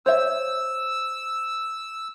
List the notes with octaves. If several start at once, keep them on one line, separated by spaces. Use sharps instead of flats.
C5 C#5 E5 E6